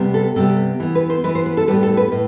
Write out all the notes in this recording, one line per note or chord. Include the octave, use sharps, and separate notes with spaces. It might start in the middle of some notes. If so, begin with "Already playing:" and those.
Already playing: C3 G3 B3
A4
C3 G3 B3 A4
E3 B3
B4
C5
E3 B3 B4
C5
B4
A4
A2 G3 B3 B4
A4
B4
A2